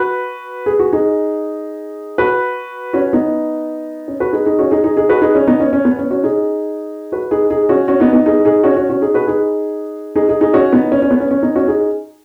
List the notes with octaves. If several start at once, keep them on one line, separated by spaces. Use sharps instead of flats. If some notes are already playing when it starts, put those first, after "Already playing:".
Already playing: F#4 B4
G#4
F#4
D#4 G#4
F#4 B4
C#4 F#4
B3 D#4
C#4
F#4 B4
D#4 G#4
D#4 G#4
C#4 F#4
D#4 G#4
D#4 G#4
D#4 G#4
F#4 B4
D#4 G#4
C#4
B3 D#4
C#4
C#4
B3
C#4
C#4 F#4
D#4 G#4
F#4 B4
D#4 G#4
D#4 G#4
C#4 F#4
C#4 F#4
B3 D#4
B3 D#4
D#4 G#4
D#4 G#4
C#4 F#4
C#4 F#4
C#4 F#4
D#4 G#4
F#4 B4
D#4 G#4
D#4 G#4
D#4 G#4
D#4 G#4
C#4 F#4
B3 D#4
C#4
C#4
B3
C#4
C#4
B3 D#4
C#4 F#4
D#4 G#4